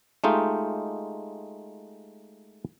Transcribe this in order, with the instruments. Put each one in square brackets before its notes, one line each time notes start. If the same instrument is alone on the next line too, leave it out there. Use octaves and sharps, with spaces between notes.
[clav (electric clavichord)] G#3 A3 D#4 F4 G4